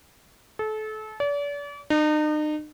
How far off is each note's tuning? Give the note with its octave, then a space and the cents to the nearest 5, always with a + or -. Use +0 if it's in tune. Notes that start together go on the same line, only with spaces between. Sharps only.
A4 -30
D5 -40
D#4 -40